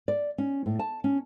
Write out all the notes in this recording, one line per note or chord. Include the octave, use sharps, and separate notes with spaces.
D5
C#4
A2
A5
C#4